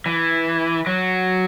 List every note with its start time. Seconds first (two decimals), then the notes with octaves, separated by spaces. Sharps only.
0.06 E3
0.87 F#3